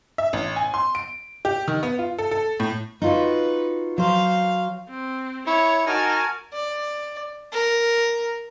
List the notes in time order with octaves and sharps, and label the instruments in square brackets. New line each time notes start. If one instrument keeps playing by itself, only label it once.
[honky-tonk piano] E5
A1
G#5
C6
D7
G4
D#3
B3
F4
A4
A4
A2
[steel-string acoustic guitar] D#4 F4 F#4 [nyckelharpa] B4
[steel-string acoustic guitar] F#3 C5 [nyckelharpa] F5
[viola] C4
[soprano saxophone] E4 [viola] C#5 C#6
[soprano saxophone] D#4 [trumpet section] F#4 A#4 [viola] G#5 A5
[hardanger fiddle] D5
A#4